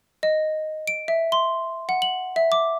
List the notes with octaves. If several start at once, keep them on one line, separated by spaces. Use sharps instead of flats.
D#5
D7
E5
C6
F#5
F#7
E5
D6